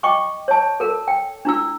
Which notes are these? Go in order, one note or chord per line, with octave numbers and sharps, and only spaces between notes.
D#5 G5 C#6 D6
C#5 A5
A4 A#4
G5
D4 E4 E6